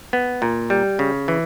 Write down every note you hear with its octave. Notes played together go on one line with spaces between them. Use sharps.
B3
A#2
G3
C#3
E3